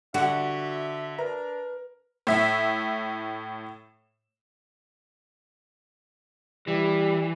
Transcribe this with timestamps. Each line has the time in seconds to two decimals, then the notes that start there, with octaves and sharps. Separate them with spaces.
0.14 D3 F#4 E5
1.18 D4 A#4 B4 A#5
2.27 A2 E5
6.68 E3 G3